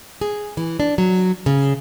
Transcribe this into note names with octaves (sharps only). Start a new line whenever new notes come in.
G#4
E3
D4
F#3
C#3